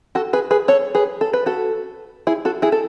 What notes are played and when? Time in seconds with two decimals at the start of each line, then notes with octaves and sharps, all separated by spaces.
0.15 F#4 A4
0.33 G#4 B4
0.51 G#4 B4
0.68 A4 C#5
0.95 G#4 B4
1.21 A4
1.33 B4
1.46 F#4 A4
2.27 E4 G#4
2.45 F#4 A4
2.62 E4 G#4
2.72 A4